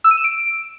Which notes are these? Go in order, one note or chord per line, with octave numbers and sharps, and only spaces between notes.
E6
D#7
E7
D7